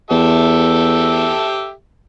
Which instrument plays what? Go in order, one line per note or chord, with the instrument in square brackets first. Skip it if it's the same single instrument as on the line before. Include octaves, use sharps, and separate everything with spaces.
[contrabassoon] E2 [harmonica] G4 A4 E5